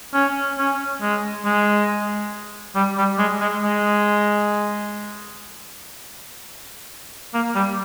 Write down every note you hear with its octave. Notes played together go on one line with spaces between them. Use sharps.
C#4
C#4
G#3
G#3
G3
G3
G#3
G#3
G#3
A#3
G3